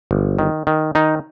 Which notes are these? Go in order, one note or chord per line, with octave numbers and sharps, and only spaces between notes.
G1
D#3
D#3
D#3 D#4